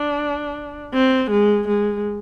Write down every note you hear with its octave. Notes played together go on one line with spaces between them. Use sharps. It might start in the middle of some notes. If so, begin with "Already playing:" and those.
Already playing: D4
C4
G#3
G#3